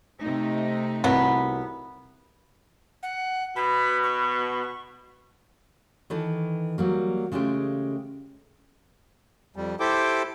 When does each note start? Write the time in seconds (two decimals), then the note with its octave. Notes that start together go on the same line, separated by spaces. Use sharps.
0.20 C3 A3 D#4
1.04 C2 F#3 B3
3.03 F#5
3.56 B2 B5
4.03 C#6
6.10 D#3 E3 A4
6.78 F#3 G3 A#3
7.32 C#3 G#3 A3 F4 G4
9.56 F2 G3
9.80 E4 G4 A4 C5 G5 D6